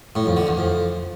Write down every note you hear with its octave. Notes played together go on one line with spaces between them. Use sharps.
A2
F2
D3
E2
F2